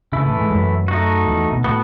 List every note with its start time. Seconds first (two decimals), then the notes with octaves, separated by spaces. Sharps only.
0.12 C#3 E3 A3 E4
0.26 A2
0.38 G#2
0.51 F#2
0.88 A3 D#4 F#4
1.27 E2
1.52 B2
1.64 A2 B3 F#4